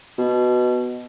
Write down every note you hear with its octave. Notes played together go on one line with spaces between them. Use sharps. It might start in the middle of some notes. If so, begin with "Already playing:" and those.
B2